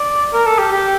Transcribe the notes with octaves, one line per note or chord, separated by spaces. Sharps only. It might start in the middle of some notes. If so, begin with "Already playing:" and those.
Already playing: D5
A#4
A4
G4
G4